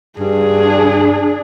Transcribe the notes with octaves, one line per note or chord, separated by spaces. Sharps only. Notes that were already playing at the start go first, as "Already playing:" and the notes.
G2 D4 G#4